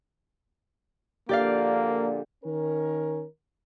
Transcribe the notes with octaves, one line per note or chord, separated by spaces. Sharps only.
A#1 A#2 D3 A#3 G4 D5 F5
D#3 C#4 A#4